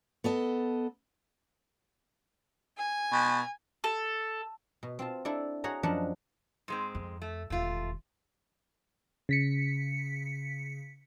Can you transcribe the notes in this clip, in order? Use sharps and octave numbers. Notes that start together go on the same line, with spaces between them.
B3 A4 D#5
G#5
B2
A4
B2
C4 F4 A5
D4 E4 A4 D5
F#4 G#4 C#5 F#5 A#5
F#2 F3 D4 D#5 F#5 A5
G#2 G#3 C4
F2
A3
E1 D#2 A3 F4
C#3 B6 C#7